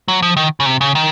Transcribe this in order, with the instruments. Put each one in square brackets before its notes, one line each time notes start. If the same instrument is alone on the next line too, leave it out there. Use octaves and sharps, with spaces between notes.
[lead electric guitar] F#3
F3
D#3
C#3
C3
C#3
D#3